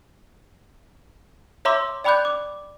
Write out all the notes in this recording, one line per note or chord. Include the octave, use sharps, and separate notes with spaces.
C#5 E5 A#5 C6 D6 E6
D5 G5 B5 D6 F#6 G6
D6